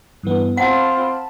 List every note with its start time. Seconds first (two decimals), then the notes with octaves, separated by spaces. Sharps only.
0.23 G2 E3 B3
0.57 C4 F4 F#5 A5 B5